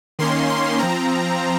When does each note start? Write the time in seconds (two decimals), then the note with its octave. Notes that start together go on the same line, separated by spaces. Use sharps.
0.19 D#3 A#3 C#4 C6
0.49 C6
0.79 F3 C4 A#5